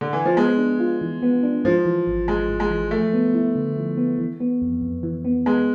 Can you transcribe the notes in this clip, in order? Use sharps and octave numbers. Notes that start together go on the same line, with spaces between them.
D3
E3
F3
G#3 B3
D4
F4
E3
B3
D4
G#2 F3
E3
G#1
G#1 G#3
G#2
G#3
E3
F3 A3
B3
E4
D3
F3
B3
E3
B3
F2
F2
E3
B3
G#3 B3